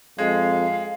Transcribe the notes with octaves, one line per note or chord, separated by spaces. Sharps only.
F2 G#3 F5